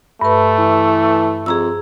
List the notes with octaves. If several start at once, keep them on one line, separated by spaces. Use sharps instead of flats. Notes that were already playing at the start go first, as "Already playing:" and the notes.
G2 A3 B4
E3
F2 G#4 A#5 E6